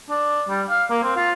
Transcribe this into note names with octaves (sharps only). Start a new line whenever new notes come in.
D4
G3
F5
A#3
C4
F4